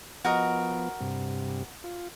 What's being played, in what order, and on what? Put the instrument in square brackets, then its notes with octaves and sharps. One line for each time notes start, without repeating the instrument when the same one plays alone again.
[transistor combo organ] F3 B3 [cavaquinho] F#4 A#4 D#5
[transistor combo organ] G2 C3
F4